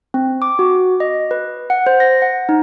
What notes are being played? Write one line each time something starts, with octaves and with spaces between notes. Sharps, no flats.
C4
D6
F#4
D#5
B4
F#5
C5
A#6
F#5
D#4